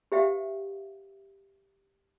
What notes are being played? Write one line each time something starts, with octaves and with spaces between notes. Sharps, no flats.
G4 B4 E5 F5 G5